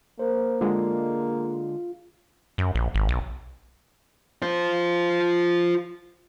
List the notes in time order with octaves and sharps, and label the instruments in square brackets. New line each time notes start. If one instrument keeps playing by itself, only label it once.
[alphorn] A#3 [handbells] A#4 C5
[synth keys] D3 G#3 [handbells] F4 F5
[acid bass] F#2
A#1
G#1
B1
[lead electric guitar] F4 C5